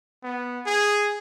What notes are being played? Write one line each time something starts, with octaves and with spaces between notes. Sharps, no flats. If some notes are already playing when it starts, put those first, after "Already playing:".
B3
G#4